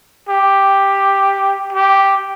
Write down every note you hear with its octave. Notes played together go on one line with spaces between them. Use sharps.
G4
G4